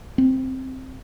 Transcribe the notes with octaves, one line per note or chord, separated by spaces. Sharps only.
C4